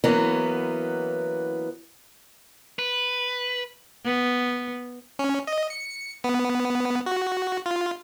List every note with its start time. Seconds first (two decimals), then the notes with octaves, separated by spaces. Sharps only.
0.04 E3 F#3 A#3 B3 C#4
2.79 B4
4.05 B3
5.19 C#4
5.47 D#5
5.70 C#7
6.24 B3
7.06 F#4
7.66 F4